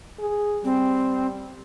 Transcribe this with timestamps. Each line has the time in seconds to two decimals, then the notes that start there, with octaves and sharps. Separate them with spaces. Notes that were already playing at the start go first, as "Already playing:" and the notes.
0.19 G#4
0.64 G3 C4